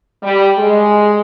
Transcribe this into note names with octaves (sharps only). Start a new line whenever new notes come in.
G3
G#3